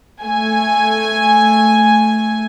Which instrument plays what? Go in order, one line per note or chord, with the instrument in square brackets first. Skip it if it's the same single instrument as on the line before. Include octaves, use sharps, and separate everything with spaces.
[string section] A3 G#5